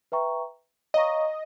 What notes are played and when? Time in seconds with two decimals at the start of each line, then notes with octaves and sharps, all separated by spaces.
0.12 B4 E5 G5 A#5 C#6
0.94 C#5 D#5 F5 A#5 C#6